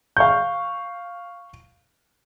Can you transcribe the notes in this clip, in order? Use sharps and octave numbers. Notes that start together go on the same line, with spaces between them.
F5 C#6 G6